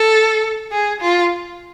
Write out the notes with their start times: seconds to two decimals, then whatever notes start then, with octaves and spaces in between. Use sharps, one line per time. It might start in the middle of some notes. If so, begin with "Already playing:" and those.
Already playing: A4
0.71 G#4
1.00 F4